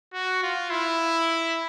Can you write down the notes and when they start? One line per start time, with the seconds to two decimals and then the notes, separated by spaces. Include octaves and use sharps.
0.14 F#4
0.43 F4
0.70 E4